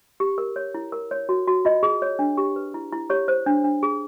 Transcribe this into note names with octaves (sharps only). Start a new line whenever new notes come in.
G4
A#4
C#5
E4
A#4
C#5
F#4
F#4
F4 D#5
G#4
C#5
D4
G4
B4
E4
E4
G4 C#5
C5
D4
D4
G#4